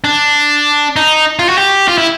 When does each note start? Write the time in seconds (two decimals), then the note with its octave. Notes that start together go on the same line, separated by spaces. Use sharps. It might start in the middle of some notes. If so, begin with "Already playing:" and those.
0.04 D4
0.96 D#4
1.39 F4
1.49 F#4
1.58 G4
1.88 F4
1.98 E4